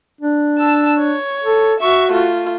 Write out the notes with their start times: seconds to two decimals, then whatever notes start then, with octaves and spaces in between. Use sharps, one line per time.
0.21 D4
0.58 A5 E6
0.98 C#5
1.44 A4
1.80 F#4 E5 C#6
2.12 A3 F4